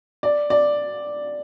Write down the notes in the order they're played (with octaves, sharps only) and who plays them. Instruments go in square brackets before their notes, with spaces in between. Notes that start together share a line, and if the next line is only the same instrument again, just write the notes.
[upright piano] D5
D5